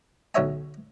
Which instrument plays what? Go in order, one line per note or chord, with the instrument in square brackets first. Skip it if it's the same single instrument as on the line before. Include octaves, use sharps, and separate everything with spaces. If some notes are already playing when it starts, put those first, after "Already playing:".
[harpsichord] B1 D3 C#5 E5 G#5